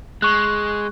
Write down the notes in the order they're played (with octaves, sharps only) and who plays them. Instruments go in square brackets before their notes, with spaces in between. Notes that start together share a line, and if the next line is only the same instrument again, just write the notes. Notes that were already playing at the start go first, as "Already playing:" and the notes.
[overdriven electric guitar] G#3 [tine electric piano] C#6 F#6